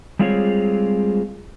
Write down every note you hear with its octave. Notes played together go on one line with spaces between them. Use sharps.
G3 G#3 C4 F4 G#4 C#5